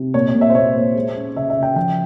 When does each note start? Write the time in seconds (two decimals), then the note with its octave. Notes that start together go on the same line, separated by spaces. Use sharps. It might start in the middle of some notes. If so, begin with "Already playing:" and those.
Already playing: C3
0.14 A#2 C#5
0.28 C#5
0.35 A#2
0.41 E5
0.50 C5
0.55 A#2 C#5
0.75 A#3
0.95 G#3
1.16 C#4
1.36 C#3 E5
1.50 E5
1.57 C#3
1.63 G5
1.76 F3 G5